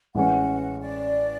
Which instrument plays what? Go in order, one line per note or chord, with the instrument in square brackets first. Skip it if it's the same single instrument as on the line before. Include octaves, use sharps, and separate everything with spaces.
[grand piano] A1 A2 E3 G#3 C#4 [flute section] F#5
[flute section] D5